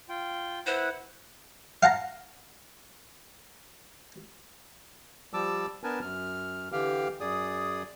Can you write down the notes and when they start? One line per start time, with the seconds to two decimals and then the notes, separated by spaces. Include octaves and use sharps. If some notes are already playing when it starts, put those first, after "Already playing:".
0.09 F4 G5
0.67 E4 B4 C5 F#5
1.83 F5 F#5 A5 A#5
5.34 F3 G3 A5 D6 E6
5.84 B3 D4 A#4 B4 G#5 A5
6.01 F#2 F6
6.72 D3 E3 G4 F5 G5 F6
7.20 F#2 G#4 D5 D#6